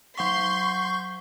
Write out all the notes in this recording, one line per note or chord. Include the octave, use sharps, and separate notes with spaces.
F#3 F#5 C6 C#6 G6 B6